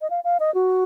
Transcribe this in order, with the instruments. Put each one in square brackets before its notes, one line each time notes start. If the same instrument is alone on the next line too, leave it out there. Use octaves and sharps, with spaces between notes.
[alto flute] D#5
F5
F5
D#5
F#4